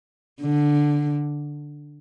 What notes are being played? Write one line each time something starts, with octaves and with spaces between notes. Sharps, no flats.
D3